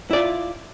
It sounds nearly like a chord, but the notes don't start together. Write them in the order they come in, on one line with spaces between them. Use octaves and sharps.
E4 D5 F4